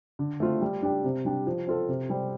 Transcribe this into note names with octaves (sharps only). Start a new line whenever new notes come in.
D3
A3 C4 F4
G3
D4 G4
C3
G3 D4 G4
F3
C4 F4 A4
C3
G3 C4